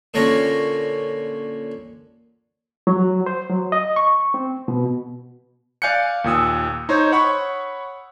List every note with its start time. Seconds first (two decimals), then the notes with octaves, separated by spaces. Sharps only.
0.14 A#2 D3 C#4 A#5
2.87 F#3
3.26 C5
3.50 F#3
3.72 D#5
3.96 C#6
4.34 C4
4.68 B2
5.82 D5 F5 G#5 F#6 G6 C#7
6.24 D#2 A#2 D#6 E6
6.89 D#4 C5 C#5
7.12 C#5 F#5 B5 C#6